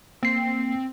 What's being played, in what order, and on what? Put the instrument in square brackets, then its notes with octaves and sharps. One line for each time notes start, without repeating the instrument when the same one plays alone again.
[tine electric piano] A#3 C7 [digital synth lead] C4